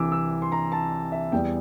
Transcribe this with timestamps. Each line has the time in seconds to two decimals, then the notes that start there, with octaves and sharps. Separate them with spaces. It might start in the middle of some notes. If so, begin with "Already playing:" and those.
Already playing: C2 C3 E3 D6 E6
0.12 E6
0.42 C6
0.52 A#5
0.72 A5
1.12 E5
1.32 E2 E3 G3 G5